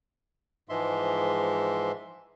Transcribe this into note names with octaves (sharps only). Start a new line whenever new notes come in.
G#2 E3 F3 G#3 E5 C6